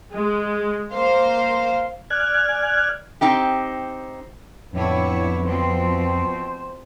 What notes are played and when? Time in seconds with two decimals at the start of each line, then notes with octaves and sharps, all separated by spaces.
0.12 G#3
0.92 A#3 C5 F5
2.10 D5 G#5 F6 F#6 G#6
3.21 C4 D#4 G4
4.73 F2 A2 D3 B3 E4 C#5
5.45 B2 F3 C4 C5